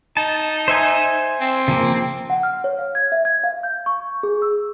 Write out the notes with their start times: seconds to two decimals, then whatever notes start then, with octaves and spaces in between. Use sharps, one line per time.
0.17 D#4 A5
0.68 C5 E5 G#5
1.41 C4
1.68 C#3 F3 A#3
2.30 F#5
2.43 F6
2.64 C#5
2.78 F5
2.95 G#6
3.12 E5
3.25 G#6
3.44 F5
3.63 G6
3.86 C#6
4.23 G#4
4.42 E6